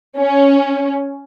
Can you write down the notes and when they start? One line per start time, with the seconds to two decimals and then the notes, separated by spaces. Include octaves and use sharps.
0.18 C#4